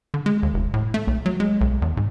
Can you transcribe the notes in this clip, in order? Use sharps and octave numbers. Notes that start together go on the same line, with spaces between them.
D3
G#3
D#2
F1
A2
A3
B1
F#3
G#3
B1
E2
G#2